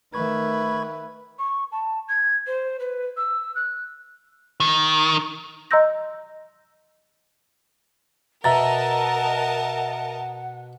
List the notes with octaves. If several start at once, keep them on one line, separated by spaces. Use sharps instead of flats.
D#3 A3 B4 E5 B5 C#6 G#6
C#6
A5
G#6
C5
B4
E6
F#6
D#3
D#5 A#5 C6 E6 G6 A#6
B2 A#4 D#5 E5 F#5 A5 A#5 A6